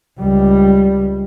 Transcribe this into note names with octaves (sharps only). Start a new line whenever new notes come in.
C#2 G3